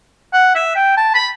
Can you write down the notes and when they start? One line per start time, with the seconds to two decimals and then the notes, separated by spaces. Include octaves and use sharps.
0.33 F#5
0.55 E5
0.76 G5
0.97 A5
1.15 B5